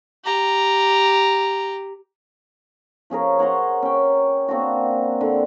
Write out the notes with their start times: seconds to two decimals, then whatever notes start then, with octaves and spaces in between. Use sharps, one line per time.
0.24 G4 A#5
3.10 F3 C#4 G#4 A#4
3.39 C#5 F#5 A#5 C6
3.82 C#4 G5
4.48 A#3 C4 D4 F#4
5.21 D3